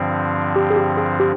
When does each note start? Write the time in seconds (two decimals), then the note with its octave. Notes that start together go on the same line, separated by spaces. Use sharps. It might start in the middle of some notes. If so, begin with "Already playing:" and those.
Already playing: G2 D3 F3 C4
0.56 G4
0.70 G#4
0.76 G4
0.97 G#4
1.20 G4